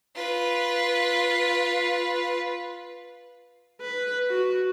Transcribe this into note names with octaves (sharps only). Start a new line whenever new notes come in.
F4 B4
B4
F#4